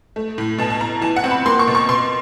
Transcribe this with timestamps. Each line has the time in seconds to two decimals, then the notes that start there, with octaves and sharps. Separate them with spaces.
0.16 A3
0.38 A2
0.58 B2 A5
0.70 A5
0.81 B2 A#5
1.02 E3 A5
1.16 F#5
1.24 C4
1.31 B5
1.46 A#3 C6
1.59 C#6
1.67 B2
1.75 C#6
1.89 B2 C6